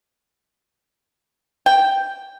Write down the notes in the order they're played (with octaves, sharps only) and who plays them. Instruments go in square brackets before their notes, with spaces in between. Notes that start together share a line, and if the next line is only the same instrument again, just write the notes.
[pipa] G5